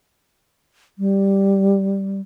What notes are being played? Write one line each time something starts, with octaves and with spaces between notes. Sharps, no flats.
G3